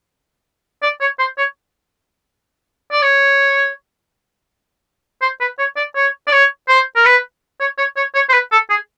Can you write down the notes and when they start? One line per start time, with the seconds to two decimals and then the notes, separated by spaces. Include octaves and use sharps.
0.83 D5
1.01 C#5
1.19 C5
1.38 C#5
2.92 D5
3.02 C#5
5.22 C5
5.40 B4
5.59 C#5
5.77 D5
5.95 C#5
6.28 D5
6.32 C#5
6.68 C5
6.96 A#4
7.05 B4
7.60 C#5
7.78 C#5
7.97 C#5
8.15 C#5
8.29 C5
8.33 B4
8.52 A4
8.70 G#4